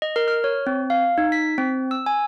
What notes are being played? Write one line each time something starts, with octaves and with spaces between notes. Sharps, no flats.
D#5
A#4
F6
C#5
C4
F5
D#4
B6
C4
E6
G#5